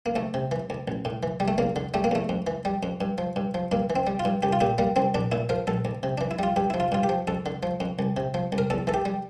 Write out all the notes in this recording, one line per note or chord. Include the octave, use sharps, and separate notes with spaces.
A#3
D2 A3
C3
E3
D2
A1
A2
E3
G3
A3
E2 A#3
D3
G3 A3
A#3
E2 A3
F2
E3
G3
F2
G2
F3
G2
F3
G2 A#3
E3
C4
G3
F4
G2
C2 G4
F4
A#2 G4
G3 A#3
C2 C4
A#1 D4
A#2 E4
F3 A#4
A#1 A4
D2
C3
E3 D4
E4
G3 F4
G2 G4
F3 E4
F4
G2 F4
G4
F3
F2 A4
D3
F3
F2
C2
C3
F3
C2
A#4
E2 A4
E3 A4
G4
G3